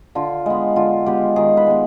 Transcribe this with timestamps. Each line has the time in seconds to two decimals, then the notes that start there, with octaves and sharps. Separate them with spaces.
0.15 D3 F4
0.46 G#3 B3
0.76 D3 F4
1.06 G#3 B3 G4
1.36 D#3 G#4
1.57 B4
1.66 G#3 B3